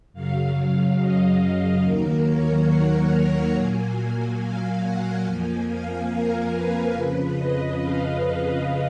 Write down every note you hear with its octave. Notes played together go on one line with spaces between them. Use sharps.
F#2 C#3 F#3 F5
F5
D#5
D#2 D#3 F#3 A#3 A#4
C#5
F#5
A#5
A#2 F#3 A#3 G#5
F5
F#5
F2 F3 A#3 G#5
F5
A#4
B4
F2 C#3 F3
D#5
F5